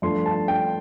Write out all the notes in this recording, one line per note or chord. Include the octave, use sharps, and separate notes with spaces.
G2 F3 A3 C6
A5
G5